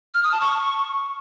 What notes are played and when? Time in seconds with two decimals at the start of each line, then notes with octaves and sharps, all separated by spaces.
0.14 F6
0.23 D#6
0.32 A5
0.41 C#6